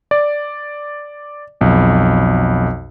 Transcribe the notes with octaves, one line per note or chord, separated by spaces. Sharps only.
D5
B1 F2